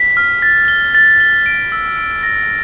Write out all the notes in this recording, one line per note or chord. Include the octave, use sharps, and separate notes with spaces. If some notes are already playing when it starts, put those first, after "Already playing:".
Already playing: B6
F6
A6
G7
A6
G7
D7
E6
D7
A#6